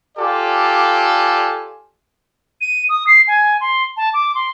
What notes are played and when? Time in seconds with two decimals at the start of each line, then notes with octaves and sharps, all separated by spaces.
0.18 F4 G4 A4 D5 G#5
2.61 D#7
2.89 D#6
3.07 C7
3.28 G#5
3.61 C6
3.97 A5
4.14 D6
4.35 C6